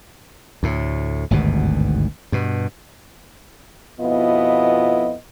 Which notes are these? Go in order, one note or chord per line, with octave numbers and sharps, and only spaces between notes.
D2 A2
G#1 D2 G2 B2
G2 B2
F2 B2 B3 E4 F4 D#5